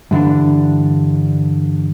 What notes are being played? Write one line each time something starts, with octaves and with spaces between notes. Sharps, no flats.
G2 D3 E3 D4